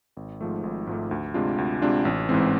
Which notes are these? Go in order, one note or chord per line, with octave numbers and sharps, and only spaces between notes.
G#1
G#2 F3 A3
G#1
G#2 F3 A3
D2
C3 G#3 D4 F4
D2
C3 G#3 D4 F4
A1
G#2 E3 G#3 C4